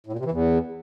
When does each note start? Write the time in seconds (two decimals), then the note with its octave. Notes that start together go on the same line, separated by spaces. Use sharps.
0.06 A2
0.13 A#2
0.19 C3
0.25 E3
0.31 E2